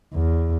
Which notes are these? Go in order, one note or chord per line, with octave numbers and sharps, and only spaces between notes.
E2